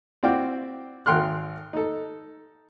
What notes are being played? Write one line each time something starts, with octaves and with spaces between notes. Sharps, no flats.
C4 E4 F#4 D5 F5 G5
G#1 F#5 G5 C6 F6 F#6
D#4 A4